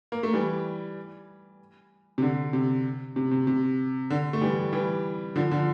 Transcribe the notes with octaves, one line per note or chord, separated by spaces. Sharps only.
A#3
A3
E3 G3
C3
D3
C3
C3
C3
C3
D3
A3
E3 G3
E3 G3
D3 F3
D3 F3